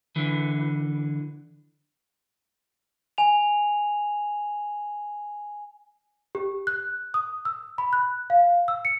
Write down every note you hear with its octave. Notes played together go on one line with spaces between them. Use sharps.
D3 E3
G#5 F7
G4
F#6
D#6
E6
B5
F#6
F5
E6
C#7